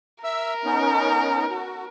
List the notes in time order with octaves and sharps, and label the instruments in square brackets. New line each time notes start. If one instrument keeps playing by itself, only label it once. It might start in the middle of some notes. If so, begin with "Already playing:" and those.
[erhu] A#4 [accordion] E5 E6
[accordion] B3 C#4 D#4
F#4